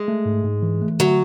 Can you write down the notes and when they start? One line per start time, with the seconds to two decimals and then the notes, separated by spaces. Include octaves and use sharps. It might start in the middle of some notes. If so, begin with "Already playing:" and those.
Already playing: G#3
0.08 A3
0.25 G#2
0.44 G#2
0.62 E3
0.82 A3
1.00 D3 F#3